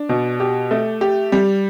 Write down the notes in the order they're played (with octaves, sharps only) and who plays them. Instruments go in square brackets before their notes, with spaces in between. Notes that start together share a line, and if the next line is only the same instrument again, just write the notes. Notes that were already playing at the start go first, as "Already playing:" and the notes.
Already playing: [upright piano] D4
B2
G4
A3
G4
G3